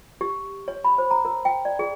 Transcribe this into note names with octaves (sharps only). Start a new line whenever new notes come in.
G4
C#5
B5
C5
A#5
A#4
G5
D5
G#4